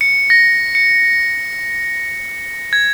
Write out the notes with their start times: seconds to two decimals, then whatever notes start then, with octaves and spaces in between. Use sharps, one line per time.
0.01 C#7
0.30 A#6
0.75 C#7
2.73 G#6